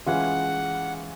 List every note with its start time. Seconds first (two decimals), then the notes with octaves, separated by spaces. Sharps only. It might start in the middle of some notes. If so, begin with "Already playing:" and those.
0.06 E3 G#3 C#4 F4 G#4 F#5